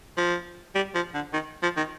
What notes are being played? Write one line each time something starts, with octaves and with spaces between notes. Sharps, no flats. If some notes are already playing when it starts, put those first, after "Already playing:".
F3
G3
F3
D3
D#3
F3
D#3